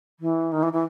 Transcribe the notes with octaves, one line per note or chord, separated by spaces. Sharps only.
E3
D#3
E3
E3